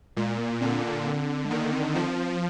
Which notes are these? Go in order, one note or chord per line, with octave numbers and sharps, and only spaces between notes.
A#2 G#3
A#3
D3 C4
D4
C4
G#3
D#3 A#3
A#3
C4
C4
F3 C4
C4